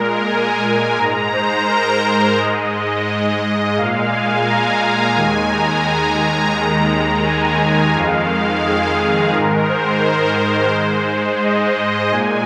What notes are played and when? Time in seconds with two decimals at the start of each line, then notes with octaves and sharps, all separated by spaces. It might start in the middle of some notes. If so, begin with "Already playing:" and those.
Already playing: A#2 G#3 A#4
0.29 G#5
0.98 G#2 G#3 A#5
1.33 C5
1.68 A#4
2.37 G#2 G#3 D#5
3.07 D#5
3.77 A#2 G#3 F5
4.12 G#5
4.46 A#5
5.16 D#2 D#3 G#3 G#5
5.51 A#5
6.55 D#2 D#3 G#3
7.25 G#5
7.59 G#5
7.94 F2 D#3 G#3 F5
8.63 G#4
9.33 G#2 D#3 G#3 A#4
9.68 C5
10.72 G#2 G#3
11.42 D#5
12.11 A#2 G#3 G#5